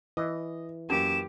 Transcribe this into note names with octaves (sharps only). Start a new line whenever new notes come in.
E3 D#5
F#2 A#3 G4 E7